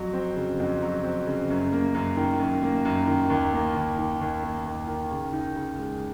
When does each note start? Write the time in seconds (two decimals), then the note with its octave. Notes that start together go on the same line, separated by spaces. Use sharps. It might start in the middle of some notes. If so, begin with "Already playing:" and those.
Already playing: F2 F#3
0.13 C4
0.36 C#3
0.60 F2
0.82 F#3
1.04 C4
1.27 C#3
1.50 F#2
1.72 A#3
1.95 F#2
2.17 D#3
2.39 F#2
2.63 A#3
2.85 F#2
3.07 D#3
3.30 D#2
3.53 A#3
3.75 D#2
3.98 D#3
4.21 D#2
4.43 A#3
4.66 D#2
4.87 D#3
5.11 C#3
5.33 D#4
5.55 C#3
5.78 G#3